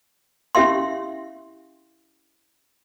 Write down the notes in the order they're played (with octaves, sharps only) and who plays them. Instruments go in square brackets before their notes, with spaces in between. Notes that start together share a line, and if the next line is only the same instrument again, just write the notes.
[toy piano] C#4 E4 G4 E5 F5 C6